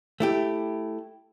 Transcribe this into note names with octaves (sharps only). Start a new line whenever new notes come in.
A3 E4 G4